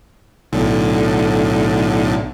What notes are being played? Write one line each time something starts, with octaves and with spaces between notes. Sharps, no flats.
B1 A2 D3